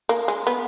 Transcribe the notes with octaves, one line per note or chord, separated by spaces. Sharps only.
A#3
G#3
B3